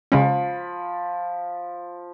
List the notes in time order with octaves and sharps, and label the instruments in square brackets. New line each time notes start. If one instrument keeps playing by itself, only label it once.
[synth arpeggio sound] C#3 G#3 C#4 [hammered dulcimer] F3 B5